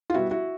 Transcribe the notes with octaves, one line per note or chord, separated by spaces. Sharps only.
F4
B2 G3 B3 E4 F#4
E4 F#4